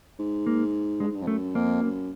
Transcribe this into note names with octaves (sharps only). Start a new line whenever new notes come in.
G#2
A#3
G2 G#3
G#2
G2
F2
F#2 A3
F2 A#3
F#2